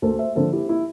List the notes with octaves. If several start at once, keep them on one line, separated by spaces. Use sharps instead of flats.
D2 A4 C5
C5 E5
D3 F3 A4 C5
E4 G4
E4